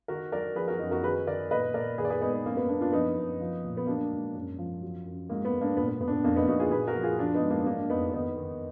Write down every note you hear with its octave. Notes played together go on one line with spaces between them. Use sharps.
D#3 F#4 A#4
F#3 A#4 D5
F3 G#4 B4
F#4 A#4
F#2 D#4 F#4
F#4 A#4
D#3 G#4 B4
D#3 A#4 D5
A#2 B4 D#5
A#2 A#4 D5
D#3 G#4 B4
D5
G#4 B4
G#2 B3 D#4
B3
F#2 A#3
B3
F#2 A#3 D4
D4 F4
F3 B3 D#4
F#2
F3
A#2
B3
F#3 A#3 D4
G#2
F#2
F3
F#3
F#2
G#2 A#3
B3
G#2
A#3 D4
A#2 B3
B3
A#2 B3
D4
B3
F2 A#3 D4
B3 D#4
F2 D#4 F#4
F4 G#4
A#2 G#4 B4
F#4 A#4
F3
F4 G#4
F3 D4 F4
B3 D#4
G#2
A#3 D4
F#3 A#3 D4
F2 B3 D#4
D#3 B3 D#4
D#3